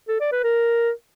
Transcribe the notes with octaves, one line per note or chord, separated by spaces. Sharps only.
A4
D5
B4
A#4